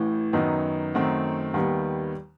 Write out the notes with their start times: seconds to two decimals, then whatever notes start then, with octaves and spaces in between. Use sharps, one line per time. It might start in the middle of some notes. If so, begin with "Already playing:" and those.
Already playing: A1 A2 E3
0.33 F#2 D#3 F#3 B3 D#4
0.94 F#2 D#3 A3 C4 F#4
1.54 D#2 D#3 G3 B3